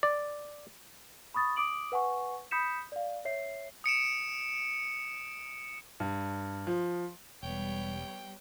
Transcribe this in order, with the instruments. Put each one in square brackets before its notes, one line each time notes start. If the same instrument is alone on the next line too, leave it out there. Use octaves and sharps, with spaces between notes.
[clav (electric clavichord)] D5
[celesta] B5 C#6 D#6 A6
D6 D#6 D7 F#7
B4 F#5 G#5 C#6
B5 D#6 G6 B6 C#7 E7
D5 F5
C#5 E5 C7
[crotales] D#6 C#7 D7 E7
[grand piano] G2
F3
[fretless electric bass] E1 [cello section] G3 [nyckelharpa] B3 C#5 [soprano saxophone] G5